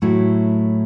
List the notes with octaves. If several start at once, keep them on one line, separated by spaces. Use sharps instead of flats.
A2 F#3 A3 E4